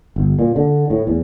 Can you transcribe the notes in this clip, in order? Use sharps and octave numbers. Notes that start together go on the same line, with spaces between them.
G1
A#2
D3
A2
E2